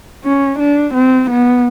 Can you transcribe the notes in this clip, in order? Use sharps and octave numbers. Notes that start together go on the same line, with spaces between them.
C#4
D4
C4
B3